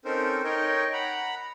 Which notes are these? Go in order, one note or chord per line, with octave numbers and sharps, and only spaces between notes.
C4 C#4 D#4 A4 A#4 C5
D#4 A#4 C#5 D#5 G5
F#5 A#5 B5